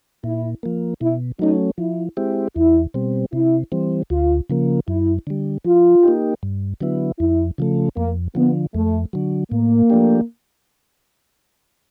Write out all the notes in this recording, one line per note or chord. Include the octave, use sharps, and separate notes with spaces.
A#2 E4
F3 A#3
B2 E4
F#3 A3 C#4 D#4
F3 E4
G#3 C4 E4 G4
E2 E4
B2 G3 C4
C3 E4
E3 G3 C4
D2 F4
C#3 F3 A#3
F#2 E4
D3 G3
F3 F4
A#3 D#4 G4
G2
D3 F#3 B3 E4
F2 E4
C#3 F3 A3
F2 A#3
D3 F3 B3
F2 A3
D3 F#3
A2 A#3
F3 A3 D4 G4